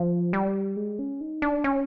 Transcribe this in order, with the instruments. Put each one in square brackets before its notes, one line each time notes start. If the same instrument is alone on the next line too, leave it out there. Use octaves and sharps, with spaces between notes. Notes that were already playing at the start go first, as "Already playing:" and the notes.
Already playing: [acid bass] F3
G3
G#3
C#4
D#4
D4
C#4